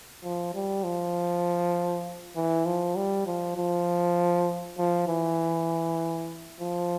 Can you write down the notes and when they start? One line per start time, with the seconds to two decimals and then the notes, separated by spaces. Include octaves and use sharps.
0.24 F3
0.54 G3
0.84 F3
2.36 E3
2.65 F3
2.96 G3
3.26 F3
3.57 F3
4.78 F3
5.08 E3
6.60 F3